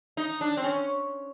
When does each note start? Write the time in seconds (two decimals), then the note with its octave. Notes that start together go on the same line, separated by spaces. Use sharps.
0.17 D#4
0.41 D4
0.57 C4
0.64 C#4